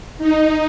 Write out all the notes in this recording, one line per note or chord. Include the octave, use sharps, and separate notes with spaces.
D#4